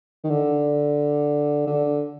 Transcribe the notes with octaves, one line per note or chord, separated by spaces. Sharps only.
D#3
D3
D3